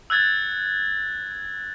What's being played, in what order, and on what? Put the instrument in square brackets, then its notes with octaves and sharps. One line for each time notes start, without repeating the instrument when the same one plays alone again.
[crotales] E6 F#6 G#6 A6